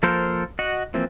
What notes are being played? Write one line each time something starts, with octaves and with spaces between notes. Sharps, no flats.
F3 A#3 A4 A#4 C5
F#4 D#5 F#5
E3 F3 A#3 C4